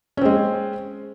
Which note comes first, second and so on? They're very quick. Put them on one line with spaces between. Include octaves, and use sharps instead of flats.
C#4 C4 G#3